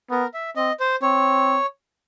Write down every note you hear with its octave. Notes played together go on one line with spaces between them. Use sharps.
B3 A#4
E5
C4 D#5
C5
C4 C#5